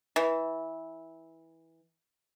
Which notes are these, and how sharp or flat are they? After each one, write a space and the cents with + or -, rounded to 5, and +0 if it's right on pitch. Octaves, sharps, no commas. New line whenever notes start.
E3 -15